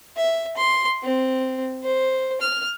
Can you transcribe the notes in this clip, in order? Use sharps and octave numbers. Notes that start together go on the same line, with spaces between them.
E5
C6
C4
C5
F6